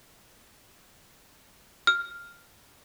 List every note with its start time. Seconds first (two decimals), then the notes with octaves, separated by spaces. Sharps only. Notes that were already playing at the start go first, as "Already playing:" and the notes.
1.87 F6